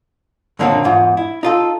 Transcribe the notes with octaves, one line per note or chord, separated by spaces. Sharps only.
F#2 A#2 D3 D#3 A#3 C4
E2 G#2 F4
E4
D#4 F4 A4